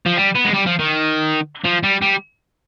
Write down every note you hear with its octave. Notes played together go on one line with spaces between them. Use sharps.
F3
G3
B3
G#3
G3
F3
D#3
F3
G3
G3